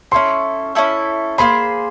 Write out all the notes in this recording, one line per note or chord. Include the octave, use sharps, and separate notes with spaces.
C#4 E4 A4 C6
C#4 E4 A4
A#3 D#4 G#4 C5 B5